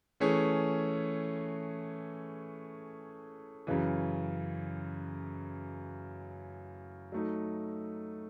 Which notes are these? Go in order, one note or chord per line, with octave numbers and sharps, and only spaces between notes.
E3 A3 C#4 G#4
F#2 C#3 E3
F#3 A3 D#4